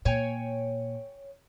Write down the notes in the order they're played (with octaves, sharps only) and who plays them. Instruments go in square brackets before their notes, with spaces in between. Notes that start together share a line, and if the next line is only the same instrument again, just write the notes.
[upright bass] A#2 [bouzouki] C#5 G5 G#5